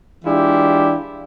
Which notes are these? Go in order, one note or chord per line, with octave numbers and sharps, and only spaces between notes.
E3 G#3 D4 E4 F4 G4